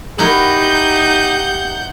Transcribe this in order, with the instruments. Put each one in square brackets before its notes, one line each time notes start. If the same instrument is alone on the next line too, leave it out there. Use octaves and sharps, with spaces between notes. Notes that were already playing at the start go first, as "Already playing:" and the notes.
[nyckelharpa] D#4 [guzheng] E4 F#4 A#4 [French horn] G4 [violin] F#5 G6